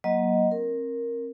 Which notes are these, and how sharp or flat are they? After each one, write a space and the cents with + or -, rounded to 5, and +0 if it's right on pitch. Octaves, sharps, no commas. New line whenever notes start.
F#3 +0 A#3 +20 D#5 +0
C4 +35 A#4 +0